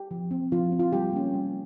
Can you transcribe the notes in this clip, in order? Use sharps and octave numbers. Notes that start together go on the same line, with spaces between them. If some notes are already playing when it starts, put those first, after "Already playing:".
Already playing: G4
F3
C4
F3 F4
C4
F4
G3 G4
A#3 C#4
G3